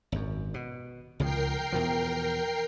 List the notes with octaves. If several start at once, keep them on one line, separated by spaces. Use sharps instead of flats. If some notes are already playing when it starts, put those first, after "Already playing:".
G#1 F#2
B2
C#2 C#3 F3 A#4 G5 C7
E2 B2 F3